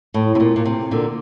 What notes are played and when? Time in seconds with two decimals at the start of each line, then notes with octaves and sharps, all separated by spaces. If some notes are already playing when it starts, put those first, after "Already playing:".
0.14 A2
0.35 C3
0.40 A#2
0.56 A#2
0.65 C3
0.91 A#2 D3